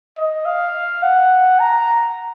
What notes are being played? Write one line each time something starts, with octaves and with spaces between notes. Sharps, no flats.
D#5
F5
F#5
A#5